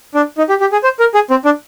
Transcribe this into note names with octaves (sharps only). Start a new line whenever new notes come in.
D4
D#4
G4
G4
G#4
C5
A#4
G#4
C4
D4